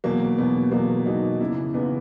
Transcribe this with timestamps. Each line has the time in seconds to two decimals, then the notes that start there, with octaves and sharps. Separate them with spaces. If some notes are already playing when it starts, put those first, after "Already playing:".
0.04 E2 B2 F#3 A#3
0.38 E2 B2 F#3 B3
0.72 E2 B2 F#3 A#3
1.06 E2 B2 F#3 D#4
1.40 E2 C#3 E3 E4
1.74 E2 C#3 E3 B3